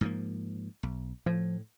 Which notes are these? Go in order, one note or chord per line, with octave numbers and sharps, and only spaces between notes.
G#2 F3 A#3
B1
A2 F3